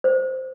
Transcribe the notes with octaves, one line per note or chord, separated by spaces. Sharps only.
C5